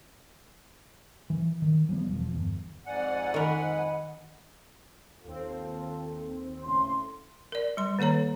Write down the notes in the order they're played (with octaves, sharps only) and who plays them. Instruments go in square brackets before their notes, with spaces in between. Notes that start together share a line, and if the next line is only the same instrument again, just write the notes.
[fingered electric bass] E3
D#3
F3 G3 A3 B3
E1 F3
G1 E2
[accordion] F2 G#2 F#5 [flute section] D5 G#5
[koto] D#3 A#4 [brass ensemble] D#5 [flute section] G#5 B5
[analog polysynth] D#2 C4 [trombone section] F4 A4
[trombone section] A2 C#3 [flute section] C6
[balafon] A#4 D5
G3 C6
D#3 A#3 A4 C#5 A#5